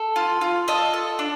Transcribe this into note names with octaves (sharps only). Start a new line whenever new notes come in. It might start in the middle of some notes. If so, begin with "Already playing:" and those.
Already playing: A4
F4
F4
A4 D#5
A4
D4